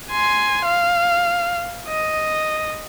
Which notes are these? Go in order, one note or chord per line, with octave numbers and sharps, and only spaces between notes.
G#5 C6
F5
D#5